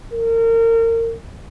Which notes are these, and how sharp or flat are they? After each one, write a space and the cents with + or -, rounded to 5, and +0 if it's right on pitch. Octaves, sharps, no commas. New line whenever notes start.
A#4 -30